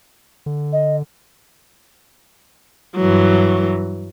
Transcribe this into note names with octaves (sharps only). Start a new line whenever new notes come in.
D3
D#5
G2 E3 F#3